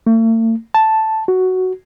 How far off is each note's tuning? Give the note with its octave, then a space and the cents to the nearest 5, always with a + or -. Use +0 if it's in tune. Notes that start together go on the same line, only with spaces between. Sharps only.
A3 +45
A5 +0
F#4 +5